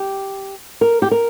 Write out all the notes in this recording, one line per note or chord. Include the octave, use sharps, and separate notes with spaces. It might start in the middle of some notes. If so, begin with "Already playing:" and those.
Already playing: G4
A#4
G4
A#4